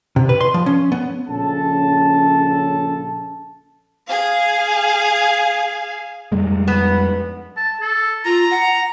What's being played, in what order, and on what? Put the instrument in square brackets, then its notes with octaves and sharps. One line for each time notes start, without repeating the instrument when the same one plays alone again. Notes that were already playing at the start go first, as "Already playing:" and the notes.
[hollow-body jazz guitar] C3
B4
C6
F3
C#4
B3
[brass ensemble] A#1 C#3 C#4 A4 A5
[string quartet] G#4 F5
[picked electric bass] F2 G3 G#3
[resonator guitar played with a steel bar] B3
[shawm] A5
A4
[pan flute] F4 [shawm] A#5
[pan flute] F#5